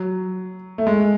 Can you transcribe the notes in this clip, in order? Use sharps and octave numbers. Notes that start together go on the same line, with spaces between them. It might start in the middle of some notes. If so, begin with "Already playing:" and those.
Already playing: F#3
A3
G#3